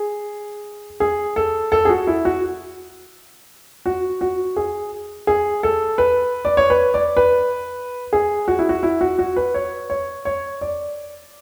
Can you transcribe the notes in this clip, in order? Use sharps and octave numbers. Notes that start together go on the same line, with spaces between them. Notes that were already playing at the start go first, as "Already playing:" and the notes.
Already playing: G#4
G#4
A4
A4
G#4
F#4
E4
F#4
F#4
F#4
G#4
G#4
A4
B4
D5
C#5
B4
D5
B4
G#4
F#4
E4
F#4
E4
F#4
F#4
B4
C#5
C#5
C#5
D5